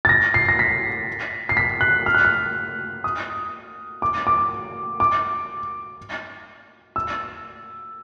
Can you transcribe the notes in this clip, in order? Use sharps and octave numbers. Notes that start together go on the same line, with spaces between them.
A6
A#6
C7
A#6
B6
C7
B6
F#6
F6
F#6
F6
D#6
D6
D6
D6
E6